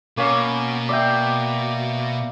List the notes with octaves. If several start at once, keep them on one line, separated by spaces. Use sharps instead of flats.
B2 A#3 C#4
D5 E5 G5